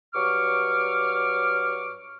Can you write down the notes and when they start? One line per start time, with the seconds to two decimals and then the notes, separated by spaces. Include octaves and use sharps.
0.14 G2 F#3 C#6 D6 F6